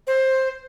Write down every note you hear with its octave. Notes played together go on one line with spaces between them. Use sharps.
C5